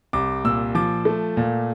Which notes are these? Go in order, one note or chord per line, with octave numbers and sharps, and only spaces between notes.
C2 D6
A#2 E6
F3 D6
A3
A#2